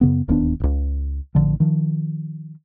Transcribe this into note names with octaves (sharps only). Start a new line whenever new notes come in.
F#2 C#3 B3
D1 D#2 B3 D4
D1 C#2
A1 D3 F3
D#3 F3